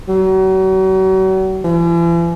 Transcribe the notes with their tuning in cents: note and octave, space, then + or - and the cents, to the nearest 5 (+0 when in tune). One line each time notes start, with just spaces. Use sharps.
F#3 +40
E3 +45